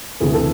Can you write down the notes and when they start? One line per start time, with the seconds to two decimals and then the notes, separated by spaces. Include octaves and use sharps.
0.20 E1 D2 C3 E3 G#4
0.33 A4